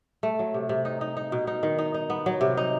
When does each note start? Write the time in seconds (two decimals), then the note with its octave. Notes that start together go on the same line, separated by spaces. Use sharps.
0.23 A3
0.39 F#3
0.54 C3
0.69 C3
0.85 D#4
1.01 D#4
1.17 D#4
1.32 B2
1.47 D#4
1.63 D#3
1.78 D#4
1.94 D#4
2.10 B3
2.26 F#3
2.41 C3
2.57 D#4